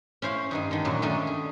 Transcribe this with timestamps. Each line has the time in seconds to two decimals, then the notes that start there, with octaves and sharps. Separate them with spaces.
0.22 C#4 E4 C5 F5
0.51 G2 D#3 G#3
0.71 D3 D#3
0.85 F#2 A#2 F#3
1.02 D#3 G#3 A3 C#4 D4
1.27 G#4